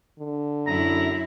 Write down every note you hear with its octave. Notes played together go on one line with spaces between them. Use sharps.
D3
F#2 E4 A#5